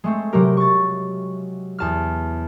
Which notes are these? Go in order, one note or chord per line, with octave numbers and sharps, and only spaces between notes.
G#3 A3 C4
C3 F#3 G4 A#4
C#6 A6
E2 A5 F6